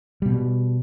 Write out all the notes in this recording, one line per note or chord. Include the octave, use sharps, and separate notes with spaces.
B2 G3